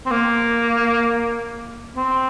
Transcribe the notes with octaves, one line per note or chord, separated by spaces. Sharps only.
C4
A#3
C4